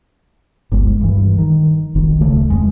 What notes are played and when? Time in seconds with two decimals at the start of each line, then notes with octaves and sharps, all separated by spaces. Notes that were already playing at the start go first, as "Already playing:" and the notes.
0.72 G1 C#2 G#3
1.01 G2 E3
1.38 D#3
1.95 F1 B1 D#3
2.20 D1 C#3 A3
2.50 F2 G#3